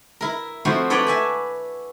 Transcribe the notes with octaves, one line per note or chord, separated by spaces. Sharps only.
E4 A#4
F3 A3 C4 E4 F#4 C5
A4 B4 C#5 D5 F#5 G5
E5 G#5 A5